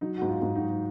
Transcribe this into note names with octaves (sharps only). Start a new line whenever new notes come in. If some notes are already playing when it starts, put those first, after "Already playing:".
F#3 D#4
G#2 F#4
F4
G#2
D#4 F#4
F#3